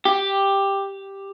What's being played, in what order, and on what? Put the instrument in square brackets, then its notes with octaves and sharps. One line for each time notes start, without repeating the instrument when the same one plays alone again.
[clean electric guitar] G4